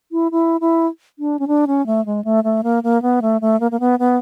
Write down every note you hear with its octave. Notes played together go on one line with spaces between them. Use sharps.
E4
E4
E4
D4
C#4
D4
C#4
A3
G#3
A3
A3
A#3
A#3
B3
A3
A3
A#3
A#3
B3
B3